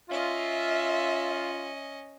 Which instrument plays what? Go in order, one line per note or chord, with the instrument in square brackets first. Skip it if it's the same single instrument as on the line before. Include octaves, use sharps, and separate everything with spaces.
[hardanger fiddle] C#4 D#5 [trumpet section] F4 [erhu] E5